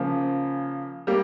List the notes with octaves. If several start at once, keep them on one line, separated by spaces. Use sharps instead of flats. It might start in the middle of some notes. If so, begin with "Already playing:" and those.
Already playing: C#3 F3 A#3 C#4
G3 A#3